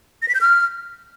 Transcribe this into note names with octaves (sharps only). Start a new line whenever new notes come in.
A#6
B6
G6
F6